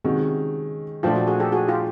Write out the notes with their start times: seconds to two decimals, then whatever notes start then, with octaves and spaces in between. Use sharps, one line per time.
0.04 C3 D#3 G#3 C#4 F#4
1.03 A#2 F3 A3 D4 F4 G4
1.15 F#4
1.27 F#4 G#4
1.40 G4 A4
1.52 F#4 G#4
1.68 F4 G4